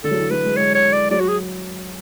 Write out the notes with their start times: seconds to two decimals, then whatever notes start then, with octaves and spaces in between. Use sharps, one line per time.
0.04 D3 A4
0.11 F#3
0.17 E3
0.31 F#3 B4
0.44 G#3
0.57 G#3 C#5
0.75 C#5
0.92 D5
1.10 F#3 D5
1.20 F#4
1.28 G#4